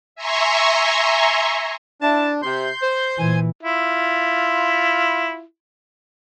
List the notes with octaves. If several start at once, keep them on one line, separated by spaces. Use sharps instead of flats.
E5 G#5 A#5 C6 C#6
D4 E4 A5
C3 C6 G6
C5
A#2 E3 G#5
E4 F4